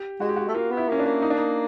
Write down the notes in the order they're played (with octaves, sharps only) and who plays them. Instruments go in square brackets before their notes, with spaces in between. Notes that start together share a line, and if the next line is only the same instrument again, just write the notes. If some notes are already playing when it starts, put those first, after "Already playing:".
Already playing: [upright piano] G4
[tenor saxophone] G#3 [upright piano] F#4
[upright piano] G4
F#4
[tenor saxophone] A3
[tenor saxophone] A#3 [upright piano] F4
[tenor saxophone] B3
[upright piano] E4
[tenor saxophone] A#3 [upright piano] C#4
[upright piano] D4
[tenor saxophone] A#3
[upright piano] D#4
D4
D#4